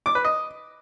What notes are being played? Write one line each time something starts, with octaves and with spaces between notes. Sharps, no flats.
D6
B4
D#5